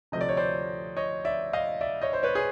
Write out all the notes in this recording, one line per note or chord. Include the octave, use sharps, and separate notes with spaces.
D2 C3 F3 A3 C4 D#5
D5
C#5
C5 D5
C#5 D#5
D5 E5
D#5 F5
D5 E5
C#5 D#5
C5
B4 C#5
G#4